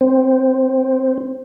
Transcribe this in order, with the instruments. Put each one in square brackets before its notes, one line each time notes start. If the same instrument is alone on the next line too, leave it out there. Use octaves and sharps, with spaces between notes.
[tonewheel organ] C4